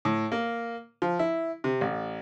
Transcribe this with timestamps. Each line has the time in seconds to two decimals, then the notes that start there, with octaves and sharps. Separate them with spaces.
0.05 A2
0.32 A#3
1.02 F3
1.19 E4
1.64 C3
1.81 A1